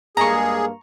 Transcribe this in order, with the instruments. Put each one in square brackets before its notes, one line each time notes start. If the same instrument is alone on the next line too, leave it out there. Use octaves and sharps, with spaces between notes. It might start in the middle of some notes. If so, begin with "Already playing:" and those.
[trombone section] G2 G#3 A#3 [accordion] G#4 [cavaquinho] A#5 C#6